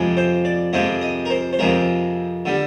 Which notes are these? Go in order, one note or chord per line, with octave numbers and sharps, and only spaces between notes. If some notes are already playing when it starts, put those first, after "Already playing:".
Already playing: F2 C3 F3 G#3
C5
D5
F2 C3 F3 G#3 D#5
D#5
A#4
C5
C5
F2 C3 F3 G#3 A#4
D3 G3